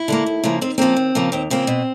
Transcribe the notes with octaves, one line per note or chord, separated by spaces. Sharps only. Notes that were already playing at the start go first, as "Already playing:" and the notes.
Already playing: E4
D3 G3 A#3
D#2
C#3 F3 A#3
D#2 C4
C#3 F3 A#3 C4
D#2
C#3 F3 A#3
D#2 C4
C#3 F3 A#3 C4
B2